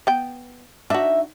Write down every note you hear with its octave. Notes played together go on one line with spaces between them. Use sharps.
B3 G5
D4 D#4 F#4 E5